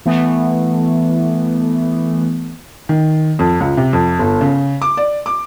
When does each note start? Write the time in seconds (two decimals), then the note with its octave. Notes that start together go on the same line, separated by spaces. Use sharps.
0.06 E3 A3 B3
2.89 D#3
3.39 F2
3.60 C#2
3.77 C3
3.93 F2
4.19 G1
4.41 C#3
4.82 D6
4.97 D5
5.26 D6